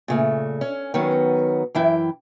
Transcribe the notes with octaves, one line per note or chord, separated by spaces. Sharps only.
A#2 C#3 A3
C#4
D#3 F#3 B3 C#4
F#2 E3 E4 G5